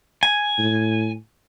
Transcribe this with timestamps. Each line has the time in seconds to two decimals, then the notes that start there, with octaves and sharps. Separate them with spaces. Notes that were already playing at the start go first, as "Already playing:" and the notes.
0.23 G#5
0.58 A2